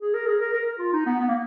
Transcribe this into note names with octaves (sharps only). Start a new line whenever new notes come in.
G#4
A#4
G#4
A#4
A#4
F4
D#4
B3
B3
A#3